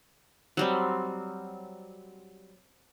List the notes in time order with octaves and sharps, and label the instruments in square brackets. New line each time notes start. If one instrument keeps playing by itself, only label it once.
[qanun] F#3 G3 C4